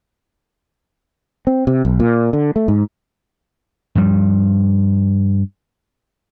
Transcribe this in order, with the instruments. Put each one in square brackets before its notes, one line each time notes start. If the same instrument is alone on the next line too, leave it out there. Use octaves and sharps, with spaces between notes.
[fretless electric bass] C4
C3
B1
A#2
D3
A3
G#2
[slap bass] G2 F3 G3